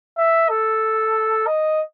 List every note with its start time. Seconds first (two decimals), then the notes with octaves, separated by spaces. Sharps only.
0.17 E5
0.49 A4
1.47 D#5